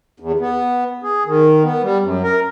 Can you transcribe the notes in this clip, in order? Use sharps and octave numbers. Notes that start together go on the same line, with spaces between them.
E2
B3
G#4
D#3
B3
G3
F#2
A#4